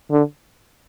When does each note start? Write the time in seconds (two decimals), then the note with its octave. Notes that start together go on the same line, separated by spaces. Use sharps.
0.11 D3